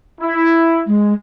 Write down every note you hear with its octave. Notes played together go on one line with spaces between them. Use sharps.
E4
G#3